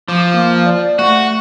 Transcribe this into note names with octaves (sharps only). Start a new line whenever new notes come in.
F3 D6
A#3
D5
A3 F#4